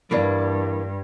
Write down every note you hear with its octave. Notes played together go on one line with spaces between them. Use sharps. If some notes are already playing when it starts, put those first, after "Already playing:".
G2 E3 A#3 D4